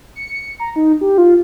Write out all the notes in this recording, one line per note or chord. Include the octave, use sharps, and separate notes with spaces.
C#7
A#5
D#4
G4
F4